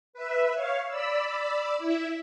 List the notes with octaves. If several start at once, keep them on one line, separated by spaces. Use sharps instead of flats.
B4 E5
C#5 F5
D5 B5 E6
E4 E5